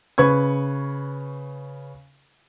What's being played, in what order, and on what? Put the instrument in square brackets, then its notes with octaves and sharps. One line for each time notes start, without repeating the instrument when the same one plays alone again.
[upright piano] C#3 B4 C#6 G#6